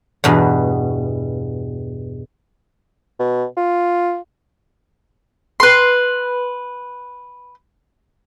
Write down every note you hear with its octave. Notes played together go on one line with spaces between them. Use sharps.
E2 G2 B2
B2
F4
B4 C6